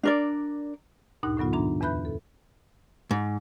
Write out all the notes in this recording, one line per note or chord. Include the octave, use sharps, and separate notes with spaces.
D4 A#4 D5
D2 G2 A#2 D#4 F#6
A2 D3 F#3 B3 F4
G2 E3 D4 A#5
E2 B4 E5 B5 F#6 G6
A4
G#2